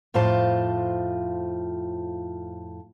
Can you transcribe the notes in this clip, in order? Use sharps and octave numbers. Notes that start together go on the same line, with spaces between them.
F2 A2 F4 C5 A5